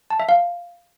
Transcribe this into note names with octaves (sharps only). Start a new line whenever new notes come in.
A5
E5
F5